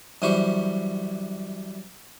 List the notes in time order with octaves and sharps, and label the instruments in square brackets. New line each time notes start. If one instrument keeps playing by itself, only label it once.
[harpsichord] F#2 E3 G3 C5 C#6